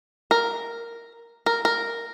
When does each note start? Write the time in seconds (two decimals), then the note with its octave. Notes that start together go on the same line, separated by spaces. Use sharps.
0.31 A#4
1.46 A#4
1.65 A#4